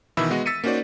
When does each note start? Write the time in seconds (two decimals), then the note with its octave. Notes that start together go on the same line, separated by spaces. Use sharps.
0.17 B2 D#3 E3 E5 B5 E6
0.30 G#3 B3 F#4 D#5
0.46 E6 A6 B6 C#7 D#7
0.64 A#3 C#4 D#4 F#4 C5 D5